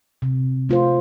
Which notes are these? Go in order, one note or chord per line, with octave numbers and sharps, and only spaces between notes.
C3
A3 F4 C5